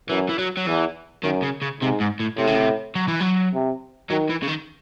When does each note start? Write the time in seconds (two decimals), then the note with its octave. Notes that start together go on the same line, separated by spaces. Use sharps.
0.09 F#2 E3
0.29 E3
0.39 F#3
0.57 F#3
0.66 E2 E3
1.23 F#2 D#3
1.43 C#3
1.62 C#3
1.81 G#2 C3
2.00 G#2
2.20 A2
2.38 A2 C3
2.47 C#3
2.56 C3
2.96 F#3
3.08 E3
3.20 F#3
3.54 C3
4.10 D#3 F#3
4.30 E3
4.43 C#3
4.48 D#3